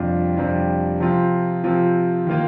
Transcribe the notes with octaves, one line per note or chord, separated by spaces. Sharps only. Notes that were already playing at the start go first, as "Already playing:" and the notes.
Already playing: F2 C3 G3 D4 F4
F2 C3 G3 D4 F4
C3 F3 C4 F4
C3 F3 C4 F4
D#3 A#3 F4